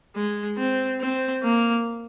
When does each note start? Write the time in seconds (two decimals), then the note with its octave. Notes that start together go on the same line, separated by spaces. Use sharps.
0.16 G#3
0.58 C4
1.01 C4
1.43 A#3